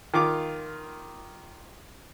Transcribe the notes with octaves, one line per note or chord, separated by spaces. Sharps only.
D#3 F4 F5 D6